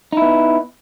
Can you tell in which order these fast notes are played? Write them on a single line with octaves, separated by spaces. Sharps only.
D#4 E4 B3